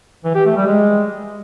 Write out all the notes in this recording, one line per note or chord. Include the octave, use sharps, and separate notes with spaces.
E3
G4
A3
G3
G#3